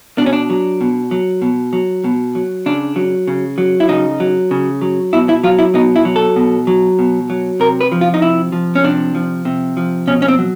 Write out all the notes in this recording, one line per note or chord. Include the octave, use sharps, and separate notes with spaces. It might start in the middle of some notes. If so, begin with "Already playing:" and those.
B2 D4
C#4
D4
F#3
B2
F#3
B2
F#3
B2
F#3
C#3 D4
F#3
C#3
F#3
E4
C#3 D#4
F#3
C#3
F#3
B2 E4
E4
F#3 F4
E4
B2 D#4
E4
F#3
A4
B2
F#3
B2
F#3
C3 A#4
B4
F3
F4
D#4
C3 E4
F3
C#4
C3 D4
F3
C3
F3
B2 C#4
C#4
C4
F#3